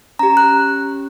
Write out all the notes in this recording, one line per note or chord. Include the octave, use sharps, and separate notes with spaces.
C#4 G4 A#5
F#6